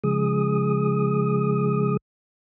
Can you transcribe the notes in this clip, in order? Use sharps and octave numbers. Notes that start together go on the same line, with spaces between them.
C#3 F3 G#3 G#4 D#6